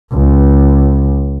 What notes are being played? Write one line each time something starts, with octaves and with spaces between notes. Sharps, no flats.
C#2